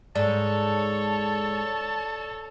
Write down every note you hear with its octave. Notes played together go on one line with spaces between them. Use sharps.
G#2 A4 C#5 D5 A5